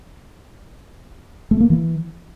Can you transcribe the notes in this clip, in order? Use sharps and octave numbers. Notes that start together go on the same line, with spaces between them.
A3
A#3
E3